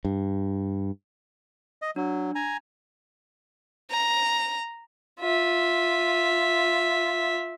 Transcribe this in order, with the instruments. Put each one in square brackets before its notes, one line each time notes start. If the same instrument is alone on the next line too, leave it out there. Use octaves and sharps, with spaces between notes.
[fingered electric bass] G2
[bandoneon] D#5
[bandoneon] F#3 [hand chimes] D4
[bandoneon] G#5 A#5
[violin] A#5
[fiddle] F4 E5